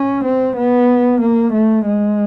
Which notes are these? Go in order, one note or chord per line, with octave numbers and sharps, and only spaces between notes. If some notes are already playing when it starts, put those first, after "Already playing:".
Already playing: C#4
C4
B3
A#3
A3
G#3